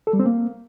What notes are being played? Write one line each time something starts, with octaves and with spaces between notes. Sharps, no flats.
A4
G3
C4
A#3